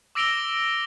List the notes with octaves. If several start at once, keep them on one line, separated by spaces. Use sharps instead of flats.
D6 E6 A#6 D7 F7 G7